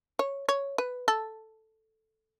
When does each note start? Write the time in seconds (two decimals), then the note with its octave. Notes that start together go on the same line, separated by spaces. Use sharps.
0.19 C#5
0.49 C#5
0.78 B4
1.08 A4